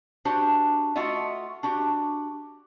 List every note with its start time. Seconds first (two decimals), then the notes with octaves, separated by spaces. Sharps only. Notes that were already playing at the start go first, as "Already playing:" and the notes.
0.25 D4 F#4 G4 C5
0.96 A3 F4 F#4 D#5 E5
1.63 D4 F#4 G4